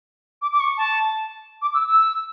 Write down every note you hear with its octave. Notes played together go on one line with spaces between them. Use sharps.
D6
D6
C#6
A5
D6
E6
E6